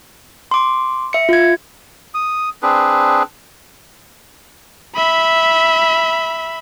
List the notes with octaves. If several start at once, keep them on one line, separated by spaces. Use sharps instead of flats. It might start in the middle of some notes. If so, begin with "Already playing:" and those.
C6 D6
E5 C#7
F4 G#6
D#6
C4 D4 G#4 B4
E5 B5